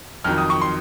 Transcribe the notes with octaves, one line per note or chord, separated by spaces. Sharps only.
F2 D#3 F#3 F6
D#6
C#6
C6